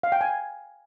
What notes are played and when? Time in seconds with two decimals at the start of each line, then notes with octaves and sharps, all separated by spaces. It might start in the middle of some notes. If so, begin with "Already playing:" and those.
0.03 F5
0.12 G5
0.21 G#5